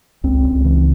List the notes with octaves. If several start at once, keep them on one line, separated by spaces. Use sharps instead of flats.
C#2 C4
C#2
C#3 E3